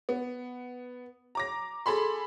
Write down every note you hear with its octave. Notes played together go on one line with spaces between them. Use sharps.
B3
A#5 D6 A#6
G#4 A4 B5 C6